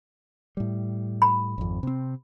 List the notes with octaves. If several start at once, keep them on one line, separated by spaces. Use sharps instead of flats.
A2 G3
B5
G#1 F2
C3 C4